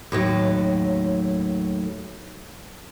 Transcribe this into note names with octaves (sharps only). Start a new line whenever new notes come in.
D#2 A2 F#3